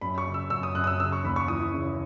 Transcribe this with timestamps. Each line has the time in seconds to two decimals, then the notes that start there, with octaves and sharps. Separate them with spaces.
0.01 F#2 B5
0.18 C#6
0.26 C#3
0.34 E6
0.50 F#2 E6
0.63 D#6
0.75 F#2 F#6
0.84 D#6
0.87 E6
1.00 C#3 E6
1.12 C#6
1.24 D#2 B5
1.36 C#6
1.48 E3 D#6
1.73 C#3